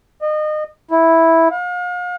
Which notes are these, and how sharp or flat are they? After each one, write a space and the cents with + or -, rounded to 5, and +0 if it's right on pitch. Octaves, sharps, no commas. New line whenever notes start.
D#5 -30
E4 -5
F5 +40